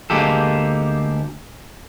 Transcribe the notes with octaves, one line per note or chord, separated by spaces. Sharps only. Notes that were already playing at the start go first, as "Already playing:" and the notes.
D2 G#3 A#3 G4 A4